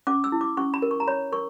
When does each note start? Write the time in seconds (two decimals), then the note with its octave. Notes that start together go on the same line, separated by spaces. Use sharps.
0.07 C#4 D6
0.24 E6
0.32 E4
0.41 D6
0.57 C#4 C#6
0.74 B5
0.82 A#4
0.91 C#6
1.00 A#5
1.07 C#5 B5
1.32 A#4 C#6